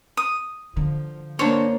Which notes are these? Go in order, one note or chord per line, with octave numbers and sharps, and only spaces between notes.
D#6
D3 F3
A#3 D4 C5 C#5